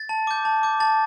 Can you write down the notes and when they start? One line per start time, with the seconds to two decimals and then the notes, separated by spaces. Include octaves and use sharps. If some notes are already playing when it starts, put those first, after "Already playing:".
Already playing: A6
0.09 A5
0.27 D6 G6
0.45 A5
0.63 D6 G6
0.80 A5 A6